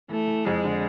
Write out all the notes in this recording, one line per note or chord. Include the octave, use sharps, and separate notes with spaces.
E3 A3
E3
F2 G#3
D3